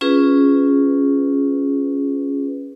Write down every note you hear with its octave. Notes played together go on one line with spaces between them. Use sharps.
C#4 F4 G#4 B4